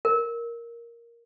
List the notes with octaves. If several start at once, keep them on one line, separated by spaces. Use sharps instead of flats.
A#4